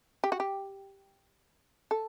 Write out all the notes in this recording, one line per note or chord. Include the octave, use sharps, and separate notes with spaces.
G4
F#4
G4
A4